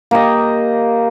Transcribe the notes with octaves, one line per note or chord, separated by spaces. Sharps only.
A#3 G4 D#5